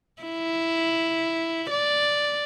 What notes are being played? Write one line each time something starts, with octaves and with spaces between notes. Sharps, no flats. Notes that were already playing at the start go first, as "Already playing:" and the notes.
E4
D5